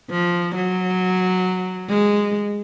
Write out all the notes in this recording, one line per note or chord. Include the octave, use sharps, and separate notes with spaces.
F3
F#3
G#3